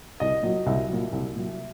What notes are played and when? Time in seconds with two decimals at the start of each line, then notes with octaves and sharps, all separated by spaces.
0.20 C2 D#5
0.43 A#2 F#3 D#5
0.66 C2 E5
0.89 A#2 F#3
1.12 C2
1.36 A#2 F#3